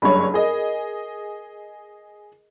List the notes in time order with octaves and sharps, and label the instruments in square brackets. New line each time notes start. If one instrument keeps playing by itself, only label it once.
[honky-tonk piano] F#1 G2 C#5 [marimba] B5
[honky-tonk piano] G#4 D#5 [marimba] A#4